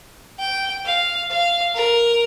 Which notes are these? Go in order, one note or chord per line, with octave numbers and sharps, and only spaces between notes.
G5
F5
F5
A#4